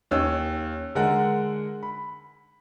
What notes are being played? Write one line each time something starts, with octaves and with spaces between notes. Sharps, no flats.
D#2 C#4 E6
D3 G#3 A#4 F#5
B5